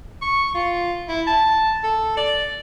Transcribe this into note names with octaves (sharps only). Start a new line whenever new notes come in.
C#6
F4
E4
A5
A4
D5